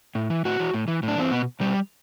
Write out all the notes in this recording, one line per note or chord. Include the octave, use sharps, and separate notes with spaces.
A2
E3
A2 F#4
E3
A2
E3
A2
D4
E3 C4
B2 B3
B2 G3